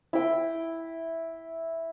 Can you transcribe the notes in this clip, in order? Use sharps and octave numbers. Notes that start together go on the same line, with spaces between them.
E4 G5